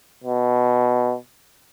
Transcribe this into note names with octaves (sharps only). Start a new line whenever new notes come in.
B2